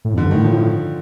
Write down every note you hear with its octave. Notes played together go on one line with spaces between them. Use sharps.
A2
F2
D3
G2
A2 D#3
F3